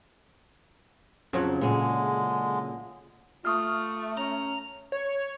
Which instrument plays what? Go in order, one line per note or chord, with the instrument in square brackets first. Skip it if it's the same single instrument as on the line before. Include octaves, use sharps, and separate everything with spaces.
[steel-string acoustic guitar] F2 F3 [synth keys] C#3 F#3
[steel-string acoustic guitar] A#2 G#4 [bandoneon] D3 G#3
[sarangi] A3 [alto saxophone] F4 [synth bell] C#6 D#6 F6
[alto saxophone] C#4 [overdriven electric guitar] A#5
[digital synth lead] C#5